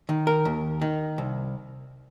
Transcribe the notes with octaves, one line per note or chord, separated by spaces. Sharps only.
D#3
A#4
D#2
D#3
C2